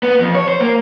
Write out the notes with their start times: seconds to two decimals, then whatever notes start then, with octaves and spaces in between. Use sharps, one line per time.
0.03 B3
0.20 F2
0.35 C#5
0.48 C5
0.60 A#3